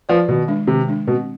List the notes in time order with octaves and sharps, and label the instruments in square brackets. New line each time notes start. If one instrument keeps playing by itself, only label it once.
[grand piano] F3 [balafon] F4 B4 D5
[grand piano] B2 [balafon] D#3
[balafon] G#3 D4
[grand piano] C3 [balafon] D#3
[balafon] G#3 D4
[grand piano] B2 [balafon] C4